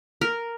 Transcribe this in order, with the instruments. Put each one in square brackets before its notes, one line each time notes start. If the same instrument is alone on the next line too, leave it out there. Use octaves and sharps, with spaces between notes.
[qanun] A#4